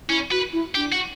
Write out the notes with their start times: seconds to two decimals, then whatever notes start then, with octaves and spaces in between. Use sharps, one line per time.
0.09 C#4 E4
0.31 F#4 B4
0.53 E4
0.75 D4 G4
0.92 F#4